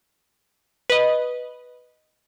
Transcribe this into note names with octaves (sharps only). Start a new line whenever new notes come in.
B4 D#5